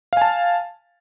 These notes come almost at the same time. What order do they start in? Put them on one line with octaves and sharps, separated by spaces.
F5 G#5 A5